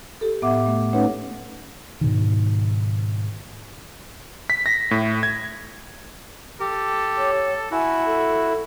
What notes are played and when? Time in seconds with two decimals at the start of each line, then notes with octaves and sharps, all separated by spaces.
0.21 G4 A4
0.42 A2 B3 E5 F#5 D6
0.66 A3
0.93 A3 C#4 D#4 B4 C#5 F#5
2.01 G#2 B2 D#3
4.50 B6
4.66 A#6
4.91 A2
5.23 G#6
6.60 G4 A4
7.17 C#5
7.72 E4 F#4 G#5
8.06 A4